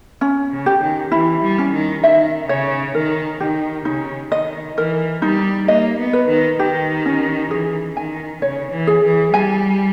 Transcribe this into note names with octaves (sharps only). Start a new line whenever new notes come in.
C#4
C#3
G4
D#3
E3 E4
G3
C#4
D#3
D#3 E5
C#3 C#5
D#3 A#4
D#3 G4
C#3 D#4
D#3 D#5
E3 A#4
G3 D#4
A#3 D#5
B3
B4
D#3
D#3 G4
C#4
E3 G#4
D#3 G#5
C#3 C#5
E3
G#4
E3
G3 G#5